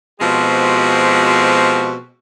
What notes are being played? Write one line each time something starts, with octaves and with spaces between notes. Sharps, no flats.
B2 F3 G#3 C4 F#4 G4